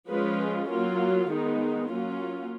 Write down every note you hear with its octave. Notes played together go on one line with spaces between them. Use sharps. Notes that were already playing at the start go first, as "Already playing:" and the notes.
F3 G#3 C#4 F4 B4
F#3 A#3 F4
D#3 G#3 B3 D#4
F#3 A#3 C#4 F4